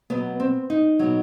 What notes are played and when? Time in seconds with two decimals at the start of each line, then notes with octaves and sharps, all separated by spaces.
0.10 B2 F#3 B3
0.40 C4
0.70 D#4
0.99 B2 F#3